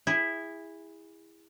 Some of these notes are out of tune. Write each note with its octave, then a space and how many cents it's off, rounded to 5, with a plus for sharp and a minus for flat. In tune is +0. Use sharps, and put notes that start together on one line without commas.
E4 +0 G#4 -25